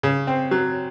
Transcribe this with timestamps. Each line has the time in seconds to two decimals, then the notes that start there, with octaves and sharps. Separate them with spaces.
0.03 C#3
0.27 C4
0.51 F#3